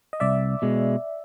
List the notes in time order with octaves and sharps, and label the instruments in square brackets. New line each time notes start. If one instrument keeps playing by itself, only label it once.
[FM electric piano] D#5
[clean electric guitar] C2 [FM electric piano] D5 E5
[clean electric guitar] B2 G#3